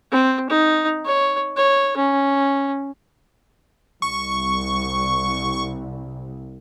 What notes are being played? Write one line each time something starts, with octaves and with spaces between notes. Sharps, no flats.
C4
D#4
C#5
C#5
C#4
C2 C#6